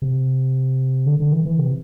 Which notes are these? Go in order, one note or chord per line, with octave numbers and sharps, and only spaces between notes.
C3
D3
D3
E3
E3
C3